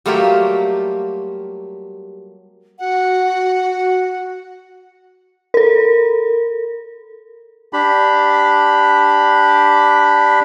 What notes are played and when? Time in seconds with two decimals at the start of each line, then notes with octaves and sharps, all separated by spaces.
0.06 F#3 G3 A3 A#3 F4 G4
2.79 F#4 F#5
5.54 A4 A#4
7.73 D4 G4 B5